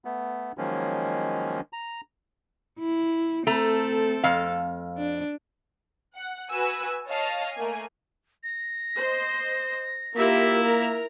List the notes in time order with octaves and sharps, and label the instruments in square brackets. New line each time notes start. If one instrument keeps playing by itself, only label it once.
[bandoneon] A3 B3
D#3 F3 F#3 G#3 A#3 C#4
A#5
[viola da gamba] E4
[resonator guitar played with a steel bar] A3 A#5 [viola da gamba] C4 A4
[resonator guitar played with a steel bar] F2 F5
[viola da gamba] D4
[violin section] F#5
F#4 B4 G#5 E6
C#5 D#5 F5 A5
A3 A#3 G#5
[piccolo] A#6
[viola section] C5 D#5
[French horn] A#3 [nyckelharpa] E4 E5 [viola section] F4 G4 A#4
[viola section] A#4 A#5